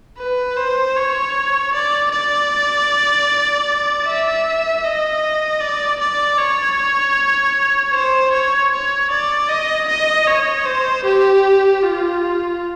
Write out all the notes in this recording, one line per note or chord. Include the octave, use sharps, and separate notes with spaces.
B4
C5
C#5
D5
D5
E5
D#5
D5
D5
C#5
C5
C#5
C#5
D5
D#5
D#5
C#5
C5
G4
F4